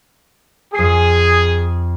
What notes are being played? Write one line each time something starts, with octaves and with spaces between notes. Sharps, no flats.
F2 G#4 D#6 C7